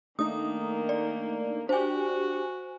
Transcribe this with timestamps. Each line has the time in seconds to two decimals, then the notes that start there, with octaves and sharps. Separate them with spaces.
0.19 D#3 A3 A#3 D4 D#4 D#6
0.89 D5
1.69 D4 F#4 G4 C5 G#5